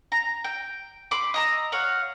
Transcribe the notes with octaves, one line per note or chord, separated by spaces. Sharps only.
A#5
G5
B5 C6 D6
D#5 A#5 E6
C#5 F5 F#5